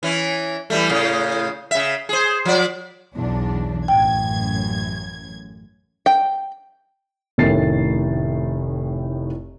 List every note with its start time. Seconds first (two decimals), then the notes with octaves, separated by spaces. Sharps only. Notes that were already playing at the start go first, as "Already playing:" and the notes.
0.03 E3 C#4
0.70 E3 G3 A3
0.89 A2 C#3
1.71 C#3 E5
2.09 G#4 C5
2.45 F3 D5
3.14 B1 E2 D4
3.88 A1 F#2 G5 G#6
6.06 G5
7.38 F1 A2 D#3 C#4 A6 C7